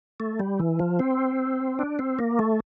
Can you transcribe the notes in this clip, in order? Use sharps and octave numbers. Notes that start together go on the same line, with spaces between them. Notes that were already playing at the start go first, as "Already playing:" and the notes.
A3
G3
E3
F3
C4
D4
C4
A#3
A3